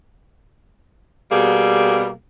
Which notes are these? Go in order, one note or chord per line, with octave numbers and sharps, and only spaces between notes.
B2 G3 A#3 G#4